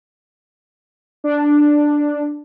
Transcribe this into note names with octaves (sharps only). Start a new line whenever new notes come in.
D4